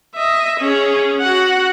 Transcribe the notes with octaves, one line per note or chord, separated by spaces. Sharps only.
D#5 E5
C#4 G#4
F#4 F#5